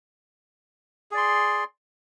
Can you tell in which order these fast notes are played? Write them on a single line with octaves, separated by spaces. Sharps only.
G#4 D5 C6